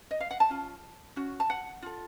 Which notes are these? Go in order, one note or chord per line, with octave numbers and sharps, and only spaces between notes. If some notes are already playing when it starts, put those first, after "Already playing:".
D#5
F5
F#5
A5
C#4 F4
C#4 F#4
A5
F#5
F4 A4